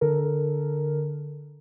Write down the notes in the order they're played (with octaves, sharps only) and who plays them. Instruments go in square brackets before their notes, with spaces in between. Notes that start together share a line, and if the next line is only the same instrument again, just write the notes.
[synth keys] D3 A4 A#4